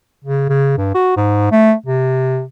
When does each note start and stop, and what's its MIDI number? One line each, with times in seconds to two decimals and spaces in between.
0.24 0.48 49
0.49 0.73 49
0.77 0.92 43
0.94 1.14 66
1.16 1.48 44
1.51 1.74 57
1.86 2.43 48